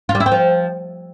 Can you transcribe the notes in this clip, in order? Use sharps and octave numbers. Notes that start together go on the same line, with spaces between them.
F4
G3
E4
C4
F3